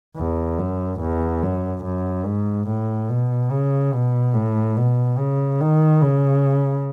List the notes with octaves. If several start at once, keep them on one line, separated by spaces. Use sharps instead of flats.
E2
F#2
E2
F#2
F#2
G#2
A2
B2
C#3
B2
A2
B2
C#3
D#3
C#3